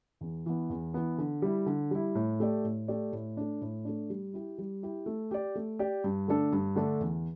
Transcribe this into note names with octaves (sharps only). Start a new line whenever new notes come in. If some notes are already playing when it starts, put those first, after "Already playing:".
E2
E3 B3
E2
E3 B3
D3
G3 E4
D3
G3 E4
A2
A3 G4 D5
A2
A3 G4 D5
A2
A3 D4
A2
A3 D4
G3
E4 G4
G3
E4 G4
A3
G4 D5
A3
G4 D5
G2
D3 A3 D4 A4
G2
D3 A3 D4 A4
E2